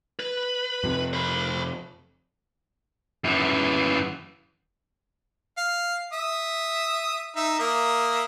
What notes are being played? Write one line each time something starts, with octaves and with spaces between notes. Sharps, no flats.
B4
F2 C3
C5 B5
F#2 E3
F5
E5 D#6
D#4 E5
A#3 E5 D#6